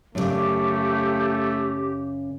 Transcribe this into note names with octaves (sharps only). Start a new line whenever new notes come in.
F#2 A#2 C#3 A3 G4